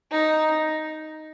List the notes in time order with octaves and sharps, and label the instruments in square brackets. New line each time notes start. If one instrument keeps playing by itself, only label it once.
[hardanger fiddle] D#4